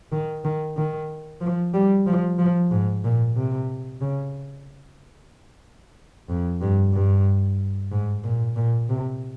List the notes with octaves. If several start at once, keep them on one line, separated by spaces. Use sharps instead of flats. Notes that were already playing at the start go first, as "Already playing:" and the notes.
D#3
D#3
D#3
F3
G3
F3
F3
G#2
A#2
C3
C#3
F2
G2
G2
G#2
A#2
A#2
C3